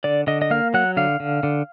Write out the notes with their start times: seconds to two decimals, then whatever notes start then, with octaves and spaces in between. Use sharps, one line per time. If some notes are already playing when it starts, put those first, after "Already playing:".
0.04 D3 D5
0.27 D3 D#5
0.42 D#5
0.51 A#3 F5
0.74 F#3 F#5
0.97 D3 F5
1.20 D3
1.43 D3